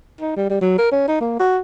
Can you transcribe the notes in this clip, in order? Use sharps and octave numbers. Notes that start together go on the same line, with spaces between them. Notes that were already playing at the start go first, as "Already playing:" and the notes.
D#4
G3
G3
F#3
A#4
C#4
D#4
A#3
F#4